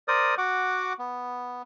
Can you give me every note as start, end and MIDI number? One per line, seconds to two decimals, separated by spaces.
0.08 0.35 70
0.08 0.35 72
0.08 0.35 74
0.08 0.35 87
0.38 0.93 66
0.38 0.93 78
0.38 0.93 86
0.99 1.62 59